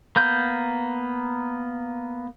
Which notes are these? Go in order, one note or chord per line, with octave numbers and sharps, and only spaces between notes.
A#3 B3 G6